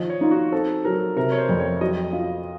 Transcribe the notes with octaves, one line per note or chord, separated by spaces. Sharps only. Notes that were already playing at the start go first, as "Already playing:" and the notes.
Already playing: D#3 F3 D#5
C#5
D#4 F4
F#4
C4 A4
F#3 A#4
C3 A#4
C#5
C5
F2
C#5
F#3 D#5
F4